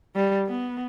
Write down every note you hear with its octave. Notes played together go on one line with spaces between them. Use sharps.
G3
B3